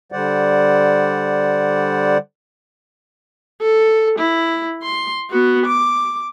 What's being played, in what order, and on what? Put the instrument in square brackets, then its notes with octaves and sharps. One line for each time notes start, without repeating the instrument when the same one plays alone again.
[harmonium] D3 G3 C5 D5 F#5
[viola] A4
E4
C6
B3 F#4
D6